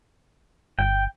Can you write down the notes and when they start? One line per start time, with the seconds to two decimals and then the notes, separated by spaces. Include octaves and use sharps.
0.79 G1 G5